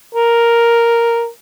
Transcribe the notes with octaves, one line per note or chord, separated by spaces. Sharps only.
A#4